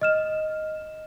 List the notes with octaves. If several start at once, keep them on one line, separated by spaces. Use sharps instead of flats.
D#5 F6 E7